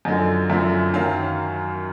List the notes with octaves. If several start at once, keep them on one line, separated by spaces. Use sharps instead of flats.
F#2 D3 F3 D#5
F#2 D3 F3 E5
F#2 D#3 F#3 F5